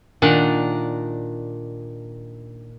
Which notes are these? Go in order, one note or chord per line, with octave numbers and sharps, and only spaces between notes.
A#2 D#3 D4 F#5